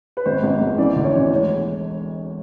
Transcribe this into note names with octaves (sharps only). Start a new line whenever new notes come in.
B4
G#1 C5
G#1
G#1
E3 D5
D2
C#5
E3
E1 C#5